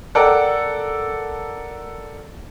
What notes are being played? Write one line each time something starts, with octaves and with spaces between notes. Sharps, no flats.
A4 A#4 D5 F#5 G5